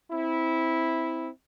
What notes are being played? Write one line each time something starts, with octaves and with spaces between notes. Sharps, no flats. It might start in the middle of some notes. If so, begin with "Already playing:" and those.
C4 E4